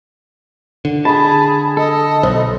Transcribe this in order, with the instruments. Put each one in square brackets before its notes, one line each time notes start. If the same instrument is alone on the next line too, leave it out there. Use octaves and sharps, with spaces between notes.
[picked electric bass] D3
[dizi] G#4 [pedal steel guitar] A5 [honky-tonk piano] B5
[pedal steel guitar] A4 [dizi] D#5
[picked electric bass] B1 [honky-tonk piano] C5